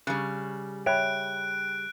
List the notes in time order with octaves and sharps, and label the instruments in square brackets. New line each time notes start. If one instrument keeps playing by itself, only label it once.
[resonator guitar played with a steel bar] C#3 G3 [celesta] F#6
[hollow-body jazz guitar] C#5 E5 [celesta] G5 B5 [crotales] F#6 D7